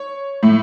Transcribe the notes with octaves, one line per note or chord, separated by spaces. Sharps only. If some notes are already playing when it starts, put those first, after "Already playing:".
Already playing: C#5
A2